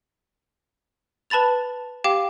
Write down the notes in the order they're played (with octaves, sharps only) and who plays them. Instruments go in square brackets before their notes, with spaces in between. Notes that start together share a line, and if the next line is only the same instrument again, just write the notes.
[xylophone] B4 A5 B5 A6 F7
G4 F5 G5 D6